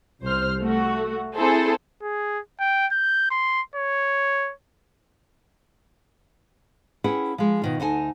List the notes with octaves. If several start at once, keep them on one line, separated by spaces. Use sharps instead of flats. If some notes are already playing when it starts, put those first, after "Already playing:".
C2 C5 F6
A3 F#4
C4 E4 G#4 A4 C5
G#4
G5
G6
C6
C#5
C#4 E4 G#4 B4 F#5 G5
F3 G#3
B2 D#3 F4
D2 D#4 F#5 G#5 A5